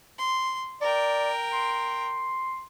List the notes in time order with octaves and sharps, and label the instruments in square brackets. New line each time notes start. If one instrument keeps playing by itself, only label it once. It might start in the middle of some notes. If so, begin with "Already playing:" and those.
[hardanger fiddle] C6
[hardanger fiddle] A#4 G5 [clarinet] D5
[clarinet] C6